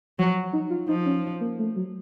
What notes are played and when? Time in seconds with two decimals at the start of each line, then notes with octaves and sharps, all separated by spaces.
0.19 F3 F#3
0.53 D#4
0.70 F4
0.89 F3 D#4
1.06 C#4
1.41 A#3
1.59 A3
1.76 F#3